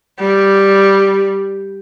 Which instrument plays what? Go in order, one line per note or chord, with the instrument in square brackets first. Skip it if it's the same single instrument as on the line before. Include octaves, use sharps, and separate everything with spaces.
[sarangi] G3